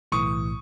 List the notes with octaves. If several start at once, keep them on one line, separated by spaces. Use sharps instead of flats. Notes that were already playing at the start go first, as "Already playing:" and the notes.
B1 A2 E3 C#6 D#6